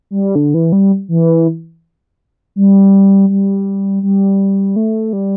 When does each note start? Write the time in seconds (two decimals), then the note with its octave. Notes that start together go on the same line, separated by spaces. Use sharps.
0.11 G3
0.35 D3
0.54 E3
0.72 G3
1.09 E3
2.56 G3
3.30 G3
4.03 G3
4.76 A3
5.13 G3